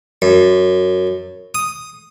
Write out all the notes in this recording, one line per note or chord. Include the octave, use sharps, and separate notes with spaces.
F#2
D#6